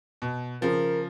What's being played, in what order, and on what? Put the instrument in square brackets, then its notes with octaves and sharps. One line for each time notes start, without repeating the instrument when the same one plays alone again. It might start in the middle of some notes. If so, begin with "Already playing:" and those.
[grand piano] B2
[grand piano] C#3 F3 [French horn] A#4